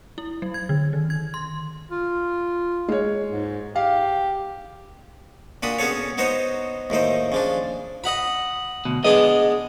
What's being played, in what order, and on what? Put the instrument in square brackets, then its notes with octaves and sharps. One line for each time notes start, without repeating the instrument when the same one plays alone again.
[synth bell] E4
F#3
G#6
D3
D#3
G#6
C6
[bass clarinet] F4
[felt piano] G#3 C#5
[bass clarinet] G#2
[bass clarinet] G4 [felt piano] F5
[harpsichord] A#2 D4 F#4 B5 D#6
B3 C#4 F#4 G#4 A4 C#5
B3 D#4 F#4 C5 C#5 D#5
D#2 A2 D#4 C5
C#3 F3 D4
D#5 F#5 B5
[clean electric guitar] D2 B2
[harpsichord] G#3 B3 D4 [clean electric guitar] D#5